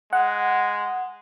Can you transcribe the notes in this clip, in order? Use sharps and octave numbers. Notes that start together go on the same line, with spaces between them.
G#3 F#5